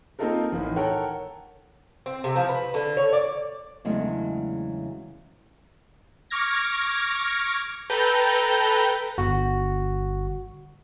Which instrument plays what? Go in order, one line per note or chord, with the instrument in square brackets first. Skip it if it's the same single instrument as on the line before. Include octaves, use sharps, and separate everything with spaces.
[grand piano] A#3 C4 D#4 F4 A4 A#4
A1 D#3
A4 A#4 C#5 F#5 G5
[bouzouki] C4
C3
F3
B4
D3
C#5
D5
[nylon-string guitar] E2 C#3 F#3 G#3 A3 D4
[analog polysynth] C#6 D6 F6 G#6 A#6
A4 B4 G5 A#5 G6
[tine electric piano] G1 F#4